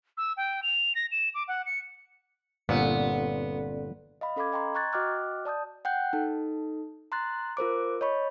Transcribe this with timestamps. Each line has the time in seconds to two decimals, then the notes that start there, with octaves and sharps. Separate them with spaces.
0.17 E6
0.37 G5
0.63 F7
0.95 A#6
1.12 E7
1.35 D6
1.48 F#5
1.66 C#7
2.69 G1 A#2 B3 C4 A4 D5
4.21 D#5 F5 B5
4.36 C#4 A4 F5 B5 D6 G#6
4.52 D#5 G5 A#5 C6
4.75 A#5 C#6 F#6 G#6 A6
4.93 F#4 D#5 G5 D6 F6 F#6
5.45 D5 A5 D#6 G6
5.85 F#5 G5 F#6 G6
6.13 D#4 A4
7.12 A#5 C6 F#6 A6
7.57 F4 A#4 C5 D6
8.01 C#5 D#5 B5 C#6